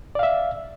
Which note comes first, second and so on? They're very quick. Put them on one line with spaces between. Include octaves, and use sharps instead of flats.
D5 F5 E5